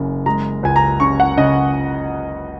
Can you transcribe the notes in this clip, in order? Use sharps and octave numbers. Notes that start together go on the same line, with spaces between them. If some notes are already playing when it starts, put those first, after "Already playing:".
Already playing: F#1 C#3
G#3 A#5
C#2 G#5
A#5
C#3 C#6
F#5
C#3 D#5